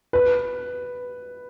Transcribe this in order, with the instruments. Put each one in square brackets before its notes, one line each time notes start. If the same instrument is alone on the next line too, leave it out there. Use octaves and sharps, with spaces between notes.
[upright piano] B4